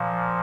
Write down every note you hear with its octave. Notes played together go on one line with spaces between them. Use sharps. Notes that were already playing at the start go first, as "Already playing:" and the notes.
Already playing: A#2 F3